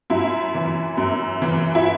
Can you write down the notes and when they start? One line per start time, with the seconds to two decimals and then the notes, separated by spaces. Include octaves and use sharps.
0.10 F#2 E4
0.55 E3
0.97 F#2
1.42 E3
1.75 E4